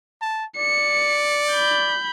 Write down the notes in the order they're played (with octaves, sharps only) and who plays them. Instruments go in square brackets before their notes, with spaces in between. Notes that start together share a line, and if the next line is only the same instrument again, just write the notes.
[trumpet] A5
[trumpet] D5 [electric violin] C#7
[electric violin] B5 G6